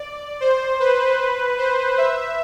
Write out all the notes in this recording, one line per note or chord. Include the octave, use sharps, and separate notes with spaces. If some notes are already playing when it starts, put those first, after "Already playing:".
Already playing: D5
C5
B4
C5
E5